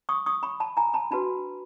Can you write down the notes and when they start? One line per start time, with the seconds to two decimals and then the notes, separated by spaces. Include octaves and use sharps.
0.09 C#6 D#6
0.26 C#6 D#6
0.43 B5 C#6
0.60 A5 B5
0.77 G#5 A#5
0.94 A5 B5
1.11 D4 F#4 B4 A5 B5